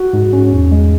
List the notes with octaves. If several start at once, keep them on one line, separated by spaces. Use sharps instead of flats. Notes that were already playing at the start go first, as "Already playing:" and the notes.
Already playing: F#4
G#2
C#4
E2
G#3